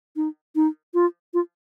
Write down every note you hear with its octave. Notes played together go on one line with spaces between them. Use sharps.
D#4
D#4
F4
F4